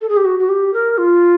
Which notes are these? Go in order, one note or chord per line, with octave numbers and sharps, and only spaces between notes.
A4
G#4
G4
F#4
F#4
G4
A#4
F4